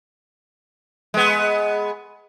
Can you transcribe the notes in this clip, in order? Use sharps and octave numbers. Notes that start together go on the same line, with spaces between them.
G#3 B3